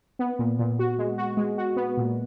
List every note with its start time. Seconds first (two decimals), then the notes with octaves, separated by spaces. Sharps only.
0.19 B3
0.39 A#2
0.59 A#2
0.79 F#4
0.99 G#3
1.18 F#4
1.37 G#3
1.58 F#4
1.76 B3
1.97 A#2